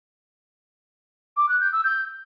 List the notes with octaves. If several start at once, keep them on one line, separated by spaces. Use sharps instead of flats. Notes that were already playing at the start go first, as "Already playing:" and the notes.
D6
F#6
G6
E6
G6